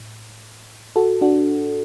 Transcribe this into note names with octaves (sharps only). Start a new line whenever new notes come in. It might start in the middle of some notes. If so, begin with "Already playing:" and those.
Already playing: A2
F#4 A4
D4 F#4